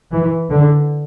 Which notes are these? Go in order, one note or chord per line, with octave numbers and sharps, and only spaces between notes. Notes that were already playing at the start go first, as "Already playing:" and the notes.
E3
D3